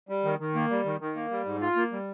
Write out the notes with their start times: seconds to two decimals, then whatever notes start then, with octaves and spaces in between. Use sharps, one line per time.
0.09 G3
0.24 D#3
0.40 D#3
0.55 A#3
0.70 G3
0.85 D#3
1.00 D#3
1.16 A#3
1.31 G3
1.45 G#2
1.61 F4
1.76 A#3
1.92 G3